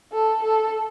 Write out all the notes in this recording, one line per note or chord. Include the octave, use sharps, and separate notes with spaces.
A4
A4